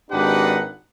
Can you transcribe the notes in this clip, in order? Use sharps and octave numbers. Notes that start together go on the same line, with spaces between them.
G#1 D4 D#4 G4 B4 F#5